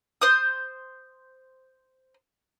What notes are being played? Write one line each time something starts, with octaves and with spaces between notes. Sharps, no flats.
C5 D#6